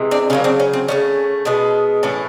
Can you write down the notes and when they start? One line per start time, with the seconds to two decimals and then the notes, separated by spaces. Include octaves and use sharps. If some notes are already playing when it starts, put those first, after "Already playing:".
Already playing: C3 E3 G#3
0.11 C4 D4
0.30 C#3 F#3 A#3 C#4
0.44 C4 D4
0.60 C#4
0.73 C4
0.88 C#3 F3 A3 C#4
1.45 B2 G#3 B3
2.03 A2 E3 A3 C#4